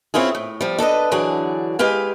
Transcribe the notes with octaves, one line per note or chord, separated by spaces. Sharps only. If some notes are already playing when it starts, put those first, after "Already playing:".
C4 C#4 E4 F4 G#4
A2
F3 G3
D4 A4 B4 D#5
D3 E3 F#3 D4 G#4
G#3 G4 B4 F5 G#5